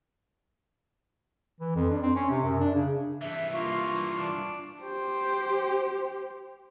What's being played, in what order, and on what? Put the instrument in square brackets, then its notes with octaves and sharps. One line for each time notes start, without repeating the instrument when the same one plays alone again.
[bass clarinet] E3
F2
D4
C4
C#4
C3
F#2
D4
C#3
[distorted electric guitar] G2 E3 [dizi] E5
[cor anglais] A#3 [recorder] F4 [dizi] C#6
[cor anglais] D4
[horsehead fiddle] G4 C5